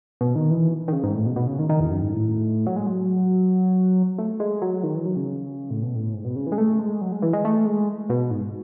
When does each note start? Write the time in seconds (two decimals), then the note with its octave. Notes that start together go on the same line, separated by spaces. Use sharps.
0.21 B2
0.35 D#3
0.50 E3
0.88 D#3
0.93 C#3
1.04 G#2
1.14 A2
1.26 B2
1.36 B2
1.47 C#3
1.59 D#3
1.69 D#3
1.80 E2
1.91 F#2
2.02 G#2
2.13 A2
2.67 F#3
2.76 G#3
2.87 F#3
4.18 A3
4.40 G#3
4.62 F#3
4.83 D#3
4.95 E3
5.06 F#3
5.17 C#3
5.70 A2
5.83 B2
5.95 A2
6.14 G#2
6.25 B2
6.36 C#3
6.47 E3
6.52 G#3
6.58 A3
6.79 G#3
7.01 F#3
7.12 G#3
7.22 E3
7.33 G#3
7.45 A3
7.66 G#3
8.09 B2
8.31 G#2